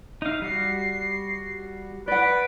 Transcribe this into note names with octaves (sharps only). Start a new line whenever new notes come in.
D#4 E5 F5
G3 F#4 C7
B4 D5 F#5 D7